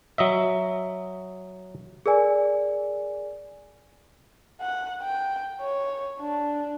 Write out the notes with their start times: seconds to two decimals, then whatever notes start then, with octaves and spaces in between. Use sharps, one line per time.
0.18 F#3 D#5 E5
2.06 G#4 A#4 D5 G#5
4.61 F#5
5.03 G5
5.60 C#5
6.20 D4